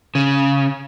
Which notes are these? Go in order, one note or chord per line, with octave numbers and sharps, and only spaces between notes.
C#3